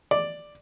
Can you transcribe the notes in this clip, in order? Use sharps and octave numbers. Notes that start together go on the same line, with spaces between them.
D5